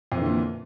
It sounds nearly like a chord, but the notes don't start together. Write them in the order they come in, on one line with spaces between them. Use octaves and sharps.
F2 E3 D3 A#2